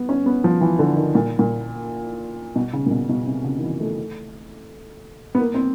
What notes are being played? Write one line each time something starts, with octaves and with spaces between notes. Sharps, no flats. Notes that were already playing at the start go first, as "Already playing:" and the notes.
Already playing: B3
C#4
B3
F3
E3
D3
D#3
A#2
A#2
B2
C#3
A#2
B2
B2
C3
C#3
D#3
E3
A3
B3
A#3
C4